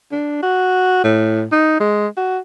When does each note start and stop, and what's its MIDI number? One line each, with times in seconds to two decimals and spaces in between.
0.12 0.41 62
0.43 1.02 66
1.04 1.44 45
1.52 1.80 63
1.80 2.07 56
2.17 2.38 66